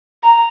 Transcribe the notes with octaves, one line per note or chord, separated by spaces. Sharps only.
A#5